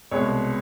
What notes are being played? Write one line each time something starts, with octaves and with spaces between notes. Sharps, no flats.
C2 B2 G#3 C#5